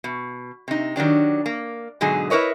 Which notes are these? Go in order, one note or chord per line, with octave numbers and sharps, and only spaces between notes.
B2
C3 D#4
D#3 F#3 D4 G4
A#3
G#2 B2 D3 F#3 G#4
E4 A#4 B4 C#5 D#5